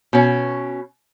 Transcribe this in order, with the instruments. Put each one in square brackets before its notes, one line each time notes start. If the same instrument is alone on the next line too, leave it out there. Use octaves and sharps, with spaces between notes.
[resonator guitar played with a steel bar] B2 C#4